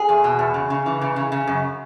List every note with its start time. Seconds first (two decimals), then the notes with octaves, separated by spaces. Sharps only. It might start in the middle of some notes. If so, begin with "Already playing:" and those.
Already playing: G#4
0.09 E2
0.24 B2
0.39 E2
0.54 C#3
0.70 C#3
0.86 E3
1.01 C#3
1.16 C#3
1.32 C#3
1.47 F#2